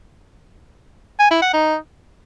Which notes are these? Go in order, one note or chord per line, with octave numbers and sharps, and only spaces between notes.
G#5
E4
F#5
D#4